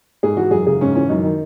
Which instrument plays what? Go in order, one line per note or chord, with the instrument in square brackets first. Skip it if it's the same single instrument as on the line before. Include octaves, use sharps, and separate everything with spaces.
[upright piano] G#2 G#4
E3 F#4
F#2 G#4
C#3 G#4
G#2 C#4
E3 C#4
F#2 D#4
D#3